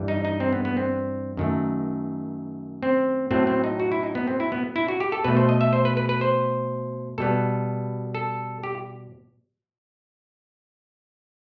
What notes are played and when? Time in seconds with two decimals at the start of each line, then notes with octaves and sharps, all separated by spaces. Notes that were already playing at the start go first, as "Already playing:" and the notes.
Already playing: G2 E3 G3
0.08 D#4
0.25 D#4
0.40 C4
0.53 B3
0.65 B3
0.77 C4
1.37 F#2 D#3 A3
2.83 C4
3.31 A2 F#3 A3 C4
3.47 C4
3.64 D#4
3.80 F#4
3.92 E4
4.03 D#4
4.15 B3
4.27 C4
4.40 E4
4.52 B3
4.76 E4
4.88 F#4
5.00 G4
5.12 A4
5.24 B2 A3 B4
5.37 C5
5.49 D#5
5.61 E5
5.73 C5
5.85 B4
5.97 B4
6.09 B4
6.21 C5
7.18 B2 G3 B3 A4
8.15 A4
8.63 G4